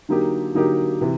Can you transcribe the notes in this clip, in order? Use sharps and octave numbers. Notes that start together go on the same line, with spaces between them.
D3 F#3 A#3 D#4 G4
D3 F#3 A#3 D#4 G4
C3 E3